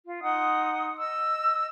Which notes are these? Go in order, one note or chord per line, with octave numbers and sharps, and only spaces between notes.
F4
D#4 F#5 C6 D#6
D#5 E6